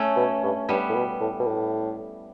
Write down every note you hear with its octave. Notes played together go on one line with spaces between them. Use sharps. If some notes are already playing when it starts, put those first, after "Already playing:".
Already playing: A3 C#4
B2
G2
G2 G3 B3
A2
B2
A2
B2
A2